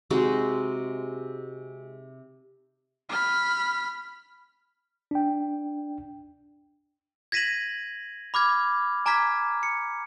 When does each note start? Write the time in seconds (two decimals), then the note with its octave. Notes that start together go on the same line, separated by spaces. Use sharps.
0.10 C3 G#3 D#4 F#4
3.09 B5 F6
5.11 D4 G5
7.32 G#6 A#6 B6 D#7 E7 F#7
8.34 B5 D6 F6 G#6
9.06 G#5 A#5 D6 F6 G#6 B6
9.63 C#7